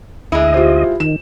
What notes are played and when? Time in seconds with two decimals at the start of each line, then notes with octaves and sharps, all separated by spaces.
0.32 D2 G#3 E4 D#5
0.54 F4 G4 C5
1.00 D#3 E7